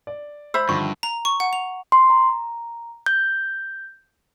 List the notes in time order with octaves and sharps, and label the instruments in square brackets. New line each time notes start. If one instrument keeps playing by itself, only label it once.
[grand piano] D5
[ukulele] C5 E5 B5 [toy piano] E6
[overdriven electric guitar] G2 [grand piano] D3 D#3 F3 [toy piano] C#6
[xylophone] A#5
C#6
F#5
F7
[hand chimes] C6
A#5
G6